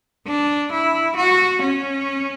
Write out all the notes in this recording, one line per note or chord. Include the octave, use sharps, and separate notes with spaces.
D4
E4
F#4
C#4